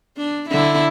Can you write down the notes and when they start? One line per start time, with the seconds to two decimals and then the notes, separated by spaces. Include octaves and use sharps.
0.17 D4
0.49 D3 E4